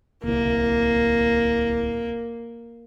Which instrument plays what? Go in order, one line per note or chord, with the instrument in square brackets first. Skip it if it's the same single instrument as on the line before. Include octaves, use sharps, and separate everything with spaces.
[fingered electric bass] D1 C2 [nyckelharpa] A#3